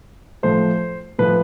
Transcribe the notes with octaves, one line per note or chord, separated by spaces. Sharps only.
A2 F3 A3 C5
A2 F3 A3 B4